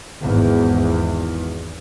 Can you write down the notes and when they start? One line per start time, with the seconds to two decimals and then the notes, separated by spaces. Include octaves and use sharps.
0.21 G#1 E2